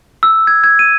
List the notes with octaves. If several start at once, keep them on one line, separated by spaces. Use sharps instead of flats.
E6
G#6
G#6
D#7